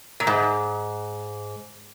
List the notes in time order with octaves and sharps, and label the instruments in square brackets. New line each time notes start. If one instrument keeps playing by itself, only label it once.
[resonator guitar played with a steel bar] A#2
G#2